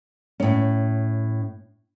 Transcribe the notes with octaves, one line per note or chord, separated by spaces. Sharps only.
A2 C#4